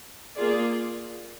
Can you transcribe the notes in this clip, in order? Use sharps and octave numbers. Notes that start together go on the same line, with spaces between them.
A#3 F4 G#4 D5